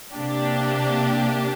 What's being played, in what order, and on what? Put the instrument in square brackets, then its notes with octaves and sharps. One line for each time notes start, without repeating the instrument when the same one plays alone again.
[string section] C3 A#3 D4 G4